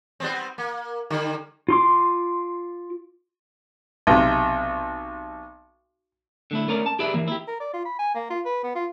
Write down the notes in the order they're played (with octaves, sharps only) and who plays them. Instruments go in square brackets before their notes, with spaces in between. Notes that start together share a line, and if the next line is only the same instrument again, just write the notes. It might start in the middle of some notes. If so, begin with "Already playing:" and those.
[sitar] G3 B3 C4
A#3
D3 G3
[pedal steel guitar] F4 C6 D6
[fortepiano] B1 C3
[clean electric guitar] D3 A3 E4
A3 C#4 A#4 D5
A5
G4 G#4 B4 D5 E5
E3 A#3
E4 G4
[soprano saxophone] A#4
D5
F4
B5
G#5
A#3
F4
B4
B3
F4